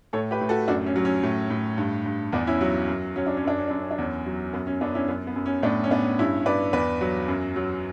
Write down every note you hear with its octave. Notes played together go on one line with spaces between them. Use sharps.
A2 A4 C#5
G4 B4
A2
F#4 A4
F#2 D4 F#4
C#4
F#3
C#4
A2
A2
G2
G2
E2 B3 D4
C#4 E4
F#3
F#2
F#3 C#4
D4
C#4
F#2 D4
C#4
F#2 D4
C#4
D4
E2 C#4
F#3
F#2 B3
C#4
F#2 B3 D4
C#4 E4
F#2 B3
B3
F#2
C#4
A2 B3 D4
C#4
A2 B3 D4
G2 C#4 E4
G2 B4 D5
E2 B4 D5
F#3
F#2
F#3